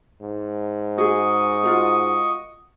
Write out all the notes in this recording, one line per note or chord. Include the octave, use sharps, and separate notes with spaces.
G#2
F#4 G#4 D#5 C#6 D#6
F4 F#4 A#4